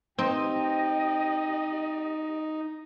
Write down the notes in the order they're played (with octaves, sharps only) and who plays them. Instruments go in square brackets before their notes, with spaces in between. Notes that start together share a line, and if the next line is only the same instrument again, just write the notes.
[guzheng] C4 [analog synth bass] D#4 [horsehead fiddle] G4 D#5 [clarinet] G5